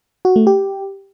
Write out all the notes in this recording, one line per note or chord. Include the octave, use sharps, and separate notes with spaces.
F#4
A3
G4